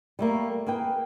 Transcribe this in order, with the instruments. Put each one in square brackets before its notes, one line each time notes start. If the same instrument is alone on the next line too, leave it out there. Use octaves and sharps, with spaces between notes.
[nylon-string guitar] G3 A3 A#3
A#3 G#4 B4 G5